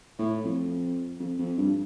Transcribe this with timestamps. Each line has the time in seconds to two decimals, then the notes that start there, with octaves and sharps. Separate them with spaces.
0.19 A2
0.44 F2
1.20 F2
1.39 F2
1.58 G2